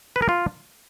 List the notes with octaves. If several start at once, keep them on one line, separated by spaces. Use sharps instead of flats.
B4
A#4
F4